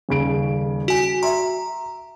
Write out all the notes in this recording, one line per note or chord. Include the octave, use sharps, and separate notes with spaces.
D#1 C#3 D7
F#4 G#5
E5 A#5 C6